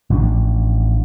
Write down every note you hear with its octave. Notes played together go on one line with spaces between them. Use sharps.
A1 F3 F#3 D4